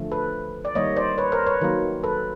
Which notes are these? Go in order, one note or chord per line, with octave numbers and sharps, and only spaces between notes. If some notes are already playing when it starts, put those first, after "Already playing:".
Already playing: D3 F3 A3
A4 B4
D5
D#3 G3 A#3 C#5 D#5
C5 D5
B4 C#5
A#4 C5
B4 C#5
D#3 F#3 A#3
A4 B4